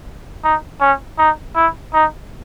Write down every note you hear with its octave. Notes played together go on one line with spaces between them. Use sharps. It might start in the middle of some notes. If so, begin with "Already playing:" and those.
D#4
C#4
D#4
E4
D#4